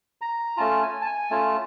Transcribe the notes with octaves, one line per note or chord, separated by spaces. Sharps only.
A#5
A3 C#4 F4 A5
G#5
A5
G#5
A3 C#4 F4 A5